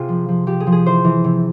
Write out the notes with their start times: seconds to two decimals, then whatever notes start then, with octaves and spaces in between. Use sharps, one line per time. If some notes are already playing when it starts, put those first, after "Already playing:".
Already playing: C3 F4 G#4
0.09 F3
0.29 F3
0.47 F3 G4
0.60 G#4
0.67 F3
0.72 G#4
0.86 E3 C5
1.04 E3
1.24 C3